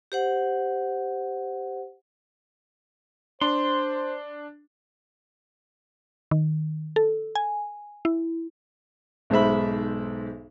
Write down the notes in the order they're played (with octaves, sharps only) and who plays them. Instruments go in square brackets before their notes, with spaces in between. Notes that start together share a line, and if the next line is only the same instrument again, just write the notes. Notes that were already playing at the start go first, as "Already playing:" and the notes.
[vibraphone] G4 C5 F#5
[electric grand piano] D4 [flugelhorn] C5 [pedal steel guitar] C6
[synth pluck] D#3
A4
G#5
E4
[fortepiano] B1 G#2 C5 E5 B5